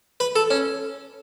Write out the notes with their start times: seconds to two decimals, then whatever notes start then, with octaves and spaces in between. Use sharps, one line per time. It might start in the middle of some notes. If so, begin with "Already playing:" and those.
0.20 B4
0.36 A4
0.51 C#4